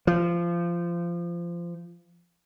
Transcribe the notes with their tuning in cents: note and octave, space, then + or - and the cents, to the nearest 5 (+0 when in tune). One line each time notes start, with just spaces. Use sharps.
F3 -20